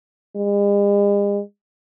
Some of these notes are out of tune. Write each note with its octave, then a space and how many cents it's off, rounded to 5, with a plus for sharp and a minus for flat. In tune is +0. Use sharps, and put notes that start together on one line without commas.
G#3 -45